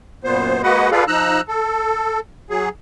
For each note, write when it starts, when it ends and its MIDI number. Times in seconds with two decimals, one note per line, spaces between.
0.24 0.62 42
0.24 0.62 46
0.24 0.62 59
0.24 0.62 72
0.63 0.90 56
0.63 0.90 58
0.63 0.90 66
0.63 0.90 71
0.63 0.90 75
0.63 0.90 78
0.91 1.04 65
0.91 1.04 68
0.91 1.04 69
0.91 1.04 71
0.91 1.04 74
0.91 1.04 77
1.07 1.41 53
1.07 1.41 63
1.07 1.41 82
1.07 1.41 88
1.07 1.41 90
1.48 2.20 69
2.50 2.69 54
2.50 2.69 68